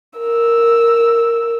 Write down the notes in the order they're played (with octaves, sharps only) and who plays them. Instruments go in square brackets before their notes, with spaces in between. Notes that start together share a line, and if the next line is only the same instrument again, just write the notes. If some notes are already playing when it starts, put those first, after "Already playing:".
[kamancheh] A#4 E6